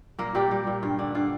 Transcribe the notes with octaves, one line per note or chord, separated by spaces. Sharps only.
A#2 A#3 A#4
A#2 G3 G4
G3
A#2
G2 F4
D3 D4
D3 F4